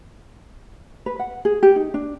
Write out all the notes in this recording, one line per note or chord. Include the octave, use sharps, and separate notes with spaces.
B4
F#5
G#4
G4
D#4
D4